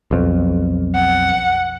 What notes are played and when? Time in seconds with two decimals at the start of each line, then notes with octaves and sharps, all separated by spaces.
0.11 B1 F2
0.95 F#5